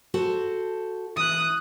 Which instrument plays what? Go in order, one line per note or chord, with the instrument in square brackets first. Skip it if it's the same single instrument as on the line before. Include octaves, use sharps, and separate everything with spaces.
[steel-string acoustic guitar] F#4 A4 C5
[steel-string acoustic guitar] E3 [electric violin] D#6 F#6